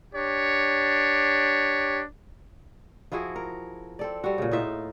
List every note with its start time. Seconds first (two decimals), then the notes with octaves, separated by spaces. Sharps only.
0.14 D4 G4 C#5
3.12 F3 E4 F#4 G#4
3.36 A#4
3.99 C4 A4 D5
4.24 G3 F#4
4.38 A#2 C#3
4.51 A2 D#4 F4 E5